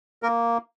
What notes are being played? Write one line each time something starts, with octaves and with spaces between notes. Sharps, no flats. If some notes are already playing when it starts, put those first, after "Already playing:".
A#3 A#4